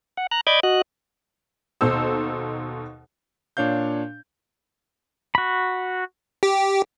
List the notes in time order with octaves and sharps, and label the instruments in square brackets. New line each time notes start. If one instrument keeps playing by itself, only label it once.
[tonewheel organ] F#5
A#5 F#6
D5 D#5 B5 D6 G6 G#6
F#4 D#5 F#6
[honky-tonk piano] D#2 B2 D#4 A4 C5 E6
[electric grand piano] A#2 D4 C#5 F5 G6
[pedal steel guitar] F#4 B5
[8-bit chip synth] G4